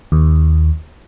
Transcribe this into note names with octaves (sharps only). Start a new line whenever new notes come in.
D#2